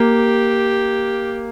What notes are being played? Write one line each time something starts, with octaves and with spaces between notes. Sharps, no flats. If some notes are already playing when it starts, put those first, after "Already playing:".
Already playing: A#3 G4